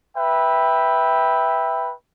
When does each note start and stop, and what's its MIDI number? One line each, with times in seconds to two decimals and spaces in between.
0.17 1.92 71
0.17 1.92 76
0.17 1.92 79